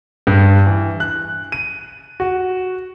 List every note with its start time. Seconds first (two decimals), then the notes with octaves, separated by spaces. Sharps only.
0.27 G2
0.66 E3
1.00 F#6
1.52 D#7
2.20 F#4